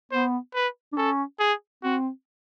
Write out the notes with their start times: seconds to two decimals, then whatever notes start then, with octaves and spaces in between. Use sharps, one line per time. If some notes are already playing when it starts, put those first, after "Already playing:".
0.12 B3 C5
0.55 B4
0.93 D4
0.97 C#4 A4
1.40 G#4
1.83 C4 F#4